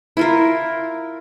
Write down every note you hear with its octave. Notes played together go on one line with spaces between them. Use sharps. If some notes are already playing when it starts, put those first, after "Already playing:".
E4 F4 A#4